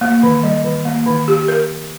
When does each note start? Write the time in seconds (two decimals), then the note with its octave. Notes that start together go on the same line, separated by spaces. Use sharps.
0.01 A#3
0.23 D#3
0.44 G3
0.64 D#3
0.85 A#3
1.06 D#3
1.28 G4
1.48 A#4